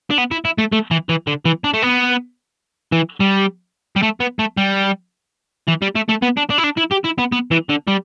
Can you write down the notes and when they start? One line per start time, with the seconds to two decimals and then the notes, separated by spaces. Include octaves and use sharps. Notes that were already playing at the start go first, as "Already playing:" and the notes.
0.10 D4
0.18 B3
0.31 E4
0.45 E4
0.58 A3
0.72 A3
0.91 E3
1.09 E3
1.27 D3
1.45 E3
1.64 D4
1.74 A3
1.82 B3
2.92 E3
3.20 G3
3.96 G3
4.03 A3
4.20 B3
4.39 A3
4.57 G3
5.68 E3
5.82 G3
5.95 A3
6.09 A3
6.22 B3
6.37 D4
6.50 D4
6.58 E4
6.64 D4
6.78 E4
6.92 G4
7.05 E4
7.19 B3
7.32 B3
7.51 E3
7.69 D3
7.87 G3